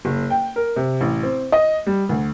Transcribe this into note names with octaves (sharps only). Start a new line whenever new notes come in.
F#1
G5
A#4
C3
A1
C4
D#5
G3
D2